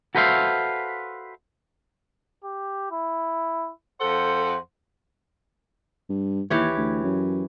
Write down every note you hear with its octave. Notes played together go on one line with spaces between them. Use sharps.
F#4 A4 B4 C5 E5 F5
G4
E4
F2 A4 C5 F#5
G2
D#2 E3 G4 C#5
D2
F#2